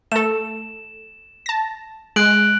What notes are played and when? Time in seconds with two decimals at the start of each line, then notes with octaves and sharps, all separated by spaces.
0.12 A3 A4 E7
1.46 A5 A#6
2.16 G#3 F#6 D7 F#7